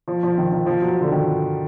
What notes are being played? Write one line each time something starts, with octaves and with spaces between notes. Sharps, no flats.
F3
F3
D#3
D#3
F3
F#3
D3
D#3